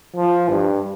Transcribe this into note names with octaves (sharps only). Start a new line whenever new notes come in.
F3
G2